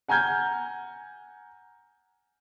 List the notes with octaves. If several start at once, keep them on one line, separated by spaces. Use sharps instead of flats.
F#5 G#5 A#5 F6 G6 G#6